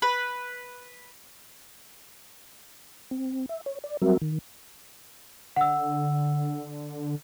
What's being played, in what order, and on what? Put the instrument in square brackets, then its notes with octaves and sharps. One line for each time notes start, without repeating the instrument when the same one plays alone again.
[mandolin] B4
[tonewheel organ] C4
E5
C#5
D5
F#3 G3 C4 F#4 A#4 E5
D#3
[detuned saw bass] D3 [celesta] F#5 E6